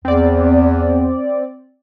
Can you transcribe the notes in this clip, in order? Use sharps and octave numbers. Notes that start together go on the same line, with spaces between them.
E2 C4 D5